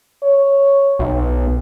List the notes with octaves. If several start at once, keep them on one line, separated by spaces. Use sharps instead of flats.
C#5
B1